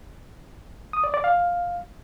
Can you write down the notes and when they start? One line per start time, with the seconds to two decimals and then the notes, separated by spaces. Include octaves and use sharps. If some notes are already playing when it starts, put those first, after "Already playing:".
0.93 D#6
1.04 D5
1.14 D5
1.24 F5